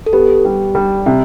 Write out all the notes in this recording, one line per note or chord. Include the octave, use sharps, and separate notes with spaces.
A4
B3 G4
G3
G3
C3